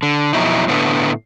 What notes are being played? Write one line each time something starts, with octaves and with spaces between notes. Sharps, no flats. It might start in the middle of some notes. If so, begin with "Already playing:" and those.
D3
F2 B2 F#3 D#4 E4
A2 D3 A3 B3